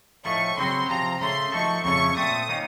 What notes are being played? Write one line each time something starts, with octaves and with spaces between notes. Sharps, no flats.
A2 F3 A3 D#4 C#6
C#3 F#3 C4 F#4 C6
C3 F3 C4 A#5
C#3 A3 C#4 C6
F3 A3 D#4 F#4 A4 C#6
F2 C#3 A3 C#4 C#6
A#2 A3 C4 D#6
D#3 A#3 C#4